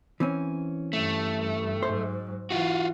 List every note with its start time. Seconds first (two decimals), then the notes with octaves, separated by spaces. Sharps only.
0.20 E3 C4 C#4
0.93 G2 A3
1.83 G#2 F#3 C5
2.50 E3 F4 F#4